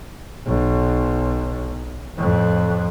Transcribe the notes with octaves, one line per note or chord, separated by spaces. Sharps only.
B1
F2 A2